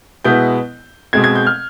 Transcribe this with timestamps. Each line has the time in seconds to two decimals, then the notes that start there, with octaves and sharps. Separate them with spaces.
0.25 B2 G#3 B3 E4 G6
1.13 B2 G#3 C4 G#6
1.24 G#6
1.36 G6
1.47 F6